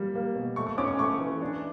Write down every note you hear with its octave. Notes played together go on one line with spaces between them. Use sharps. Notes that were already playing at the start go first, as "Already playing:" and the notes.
Already playing: G3 A#3
A#3
B2
A3 C#6
C#6
C#4 D6
C#6
A3 C#6
E3
D4